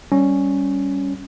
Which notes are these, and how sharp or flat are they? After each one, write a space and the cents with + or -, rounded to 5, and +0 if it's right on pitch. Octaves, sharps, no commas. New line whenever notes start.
G3 +0 C#4 +0